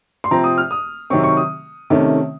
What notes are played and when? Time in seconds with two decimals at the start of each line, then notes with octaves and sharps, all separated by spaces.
0.24 C6
0.31 C3 F3 C4 A#5
0.44 D#6
0.58 F6
0.71 D#6
1.10 C3 D#3 F#3 C4 C#6
1.24 C#6
1.37 D#6
1.90 C3 D#3 A3 C#4